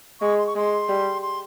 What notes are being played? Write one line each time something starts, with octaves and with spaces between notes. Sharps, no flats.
G#3 C#6
C6
C#6
G#3 C6
G3
C6